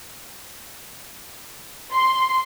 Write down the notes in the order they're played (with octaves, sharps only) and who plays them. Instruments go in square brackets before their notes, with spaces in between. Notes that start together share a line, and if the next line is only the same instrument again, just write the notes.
[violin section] C6